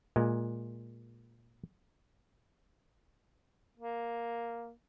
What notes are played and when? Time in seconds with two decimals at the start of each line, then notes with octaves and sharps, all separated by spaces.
0.16 A#2 G#3
3.78 A#3